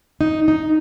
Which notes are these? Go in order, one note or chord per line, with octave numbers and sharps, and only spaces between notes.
D#4
D#4